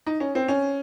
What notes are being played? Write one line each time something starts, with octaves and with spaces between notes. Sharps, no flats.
D#4
C#4
C4
C#4